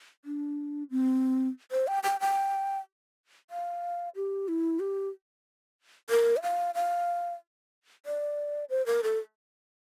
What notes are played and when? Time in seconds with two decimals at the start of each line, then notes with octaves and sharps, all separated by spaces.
0.25 D4
0.91 C4
1.72 C5
1.87 G5
2.03 G5
2.20 G5
3.50 F5
4.16 G4
4.48 E4
4.80 G4
6.10 A#4
6.37 E5
6.43 F5
6.75 F5
8.06 D5
8.70 C5
8.86 A#4
9.03 A4